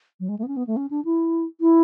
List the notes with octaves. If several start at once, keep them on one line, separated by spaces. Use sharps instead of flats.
F#3
G#3
A3
B3
C#4
B3
A3
C#4
D4
E4
E4